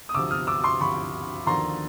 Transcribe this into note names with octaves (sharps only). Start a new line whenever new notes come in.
D#6
D2 C3 F3 D6 E6
D#6 F6
D6 E6
C6 D6
D2 C3 F3 B5 C#6
D#2 D3 F3 A#5 C6